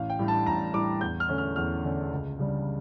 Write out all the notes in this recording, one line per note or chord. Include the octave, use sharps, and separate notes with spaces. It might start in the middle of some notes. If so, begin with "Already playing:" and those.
Already playing: A1 F5
G5
A2 G3 D4
A5
A1 A#5
A2 G3 D4 D6
E2 G6
F6
D3 A3 C#4
F6
E2 F6
D3 A3 C#4
C#2
C#3 G3 D4